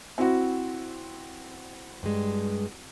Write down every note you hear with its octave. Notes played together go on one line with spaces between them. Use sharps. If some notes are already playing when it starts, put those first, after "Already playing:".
C4 E4 F#4
G2 G#3